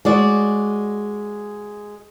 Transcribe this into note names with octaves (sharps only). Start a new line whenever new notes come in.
G#3 F#4 D5